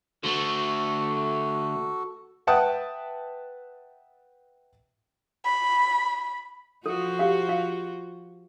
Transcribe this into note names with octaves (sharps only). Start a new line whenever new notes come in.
D3 A3 F#4 A4
B4 E5 F#5 G5 A5 D#6
B5
F3 F4 F#4 A4
G4 F5
F5